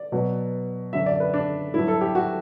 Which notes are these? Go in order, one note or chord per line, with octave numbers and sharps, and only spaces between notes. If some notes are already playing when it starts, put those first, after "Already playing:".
Already playing: D5
B2 F#3
F#2 D3 F#3 E5
D5
B4
D4
G2 E4
F#3
A4
G4
F#4